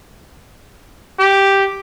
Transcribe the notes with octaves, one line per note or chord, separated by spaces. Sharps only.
G4